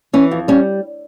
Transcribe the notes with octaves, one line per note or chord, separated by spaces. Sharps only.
E3 C#4
F2
G3 C#4